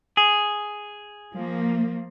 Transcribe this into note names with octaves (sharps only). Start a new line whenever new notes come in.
G#4
F3 A#3